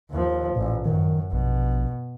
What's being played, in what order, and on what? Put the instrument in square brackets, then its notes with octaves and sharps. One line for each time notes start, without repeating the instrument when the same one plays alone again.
[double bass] D#2 F3
[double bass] A1 [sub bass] A#2
[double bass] F#2 [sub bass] D#3
[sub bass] A#1 [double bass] B2